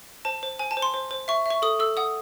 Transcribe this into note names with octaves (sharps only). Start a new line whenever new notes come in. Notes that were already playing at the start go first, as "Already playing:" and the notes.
C5 A5
C5
C5 G#5
A5
C5
C6
C5
C5
E5 C#6
E5 C#6
A4 D#6
A4 E6
F#5 D#6